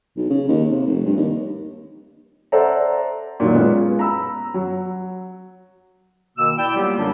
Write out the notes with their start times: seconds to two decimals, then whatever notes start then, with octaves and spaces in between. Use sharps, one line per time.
0.16 B1
0.30 C#3
0.48 D#2
0.70 C3
0.87 F1
1.05 G2
1.17 D#2
2.52 A4 C5 D5 E5 F#5 A#5
3.40 A#2 D#3 F#3
3.55 G#3 B3 C#4 F4
3.99 A#5 B5 E6
4.54 F#3
6.37 B2 D#3 A#3 E6
6.57 E4 D5 G5
6.75 F#3 G3 A#3 B3 F4 G4
6.97 F#2 D3 F#3 G3 A#3 D4